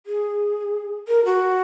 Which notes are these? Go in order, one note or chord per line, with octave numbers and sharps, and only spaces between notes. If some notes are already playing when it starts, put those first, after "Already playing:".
G#4
A#4
F#4